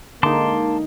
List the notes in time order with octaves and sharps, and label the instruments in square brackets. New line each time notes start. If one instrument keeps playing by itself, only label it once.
[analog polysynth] D3 G#3 D#4 [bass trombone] A#3 [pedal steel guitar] A5 C6 D6